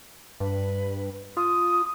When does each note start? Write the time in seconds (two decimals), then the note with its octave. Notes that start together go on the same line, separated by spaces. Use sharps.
0.40 G2 B4
1.37 F4 D#6